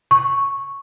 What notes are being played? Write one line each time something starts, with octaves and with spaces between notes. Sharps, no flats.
C#6